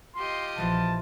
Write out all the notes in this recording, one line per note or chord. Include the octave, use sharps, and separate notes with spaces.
F4 G4 D#5 C6
A#1 E3 F3 A5